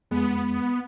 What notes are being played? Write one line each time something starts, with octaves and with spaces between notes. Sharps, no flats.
F2 G#3 B3